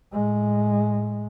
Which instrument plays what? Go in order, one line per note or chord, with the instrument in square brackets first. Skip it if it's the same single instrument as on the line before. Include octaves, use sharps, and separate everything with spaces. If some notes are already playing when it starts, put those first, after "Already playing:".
[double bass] A2 G#3